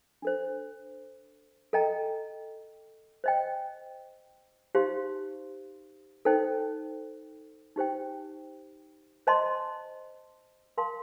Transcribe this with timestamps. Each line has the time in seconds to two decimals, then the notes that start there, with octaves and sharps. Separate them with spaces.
0.22 D4 A4 C5
1.73 A4 D#5 G5 A#5
3.24 C5 D#5 G5
4.75 D#4 G4 C5 F5 C6
6.25 D#4 A4 C5 G5
7.76 D#4 G4 C5 G5
9.27 C5 D#5 A5 C6
10.78 A#4 F5 A5 C6